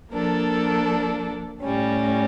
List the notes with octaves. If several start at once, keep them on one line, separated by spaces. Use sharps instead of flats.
F3 A#3 D4 A4
A2 G3 C#4